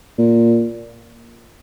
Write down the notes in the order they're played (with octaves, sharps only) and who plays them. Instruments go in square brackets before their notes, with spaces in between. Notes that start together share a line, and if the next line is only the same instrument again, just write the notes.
[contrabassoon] A#2